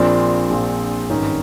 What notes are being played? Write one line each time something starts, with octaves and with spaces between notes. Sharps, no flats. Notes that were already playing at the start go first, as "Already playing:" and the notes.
Already playing: A#1 A#2 F3 C4 D4
A#1 A#2 F3
G#1 G2 D#3 C#4 D#4